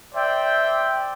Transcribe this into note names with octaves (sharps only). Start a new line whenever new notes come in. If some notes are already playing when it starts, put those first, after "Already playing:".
C5 D5 E5 G5